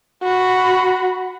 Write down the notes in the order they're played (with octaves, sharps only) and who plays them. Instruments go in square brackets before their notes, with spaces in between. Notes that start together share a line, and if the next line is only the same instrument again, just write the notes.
[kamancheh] F#4 B5